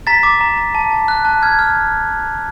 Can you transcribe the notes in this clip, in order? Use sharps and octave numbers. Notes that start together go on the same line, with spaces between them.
A#5 A6 B6
D6
A#5
A#5
A5
A5
F#6
A5
F6 G#6
F6